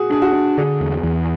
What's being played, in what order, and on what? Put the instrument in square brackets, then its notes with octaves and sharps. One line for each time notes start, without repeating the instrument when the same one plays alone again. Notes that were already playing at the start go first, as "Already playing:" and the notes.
Already playing: [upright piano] F#4 G#4
[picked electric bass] D4 [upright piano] G#4
[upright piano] F#4
[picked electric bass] D4
[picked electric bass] D3 [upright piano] G#4
[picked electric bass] E2
E2